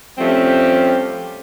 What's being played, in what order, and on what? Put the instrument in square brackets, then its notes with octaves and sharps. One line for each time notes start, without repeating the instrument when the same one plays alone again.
[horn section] F3 G3 A3 C4 C#4 G4